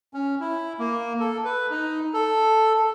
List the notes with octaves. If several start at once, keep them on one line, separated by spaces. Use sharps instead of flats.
C#4
E4
A#3
A4
B4
D#4
A4
A4